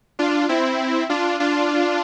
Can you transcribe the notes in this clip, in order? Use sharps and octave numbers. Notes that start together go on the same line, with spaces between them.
D4 F4
C4 E4
D4 F4
D4 F4